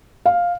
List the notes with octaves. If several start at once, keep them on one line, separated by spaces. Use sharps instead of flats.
F5